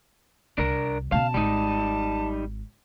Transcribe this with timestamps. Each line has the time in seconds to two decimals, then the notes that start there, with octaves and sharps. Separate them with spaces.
0.58 C2 D4 A#4
1.12 B2 C#4 F5 A5
1.34 G#1 G3 D#4